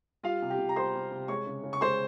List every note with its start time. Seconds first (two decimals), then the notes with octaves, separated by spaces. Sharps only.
0.23 G3 F4 F5
0.42 C3
0.50 G4 G5
0.58 C3
0.69 A#5
0.76 G3 C5 C6
0.95 G3
1.11 C3
1.28 G#3 C#5 C#6
1.46 C#3
1.63 C#3
1.73 C#6
1.81 G#3 C5 C6